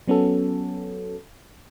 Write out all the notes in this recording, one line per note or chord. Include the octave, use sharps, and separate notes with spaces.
F#3 B3 C#4 F#4 A4